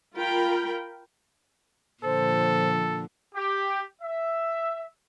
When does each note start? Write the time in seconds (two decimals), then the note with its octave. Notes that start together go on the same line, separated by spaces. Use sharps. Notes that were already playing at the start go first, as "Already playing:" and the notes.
0.16 F4 A#4 G5 B5
2.04 A#2 D3 F3 A4 C5
3.35 G4
4.02 E5